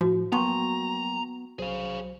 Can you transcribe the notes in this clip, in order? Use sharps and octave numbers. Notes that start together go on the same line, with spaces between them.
A2 F3 F#4
F#3 A#3 B3 G5 A5 A#5 C6 C#6
B1 F#3 G#4 C5 F5